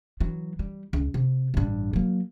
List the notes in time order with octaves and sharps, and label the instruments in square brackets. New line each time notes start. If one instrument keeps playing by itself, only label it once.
[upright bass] E3 F#3
G3
C#2
C3
A1 G2
F#3 A#3